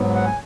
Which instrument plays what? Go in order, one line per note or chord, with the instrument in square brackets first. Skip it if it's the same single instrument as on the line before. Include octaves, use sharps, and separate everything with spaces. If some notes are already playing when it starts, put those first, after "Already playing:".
Already playing: [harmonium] G#2 F#3 B3
F#5
G#5